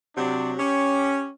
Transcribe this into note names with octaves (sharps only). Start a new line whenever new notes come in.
C3 F#3 D4
C#4 G4